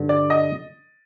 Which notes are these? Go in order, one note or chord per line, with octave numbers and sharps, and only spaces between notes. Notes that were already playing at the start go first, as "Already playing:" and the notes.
Already playing: G2 D3
D5
D#5